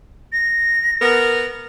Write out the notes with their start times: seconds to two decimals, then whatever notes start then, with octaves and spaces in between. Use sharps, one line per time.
0.32 A#6
1.02 B3 A#4